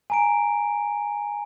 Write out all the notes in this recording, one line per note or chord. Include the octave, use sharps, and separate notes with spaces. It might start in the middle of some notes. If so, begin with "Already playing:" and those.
G#5 A#5 D7